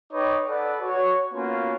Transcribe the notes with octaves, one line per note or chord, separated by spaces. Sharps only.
D#4 B4 C#5 G5 D6
A4 B4 D5 F#5
F#4 C#5
A#3 B3 C#4 F4 F#4